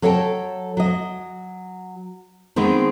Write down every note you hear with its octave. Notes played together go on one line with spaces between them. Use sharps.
F#3 A4 C#5 D#5 G5 A5
F#3 D#5
D#3 G#3 B3 C4 D#4